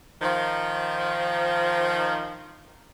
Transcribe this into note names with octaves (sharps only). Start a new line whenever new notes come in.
D#3 F3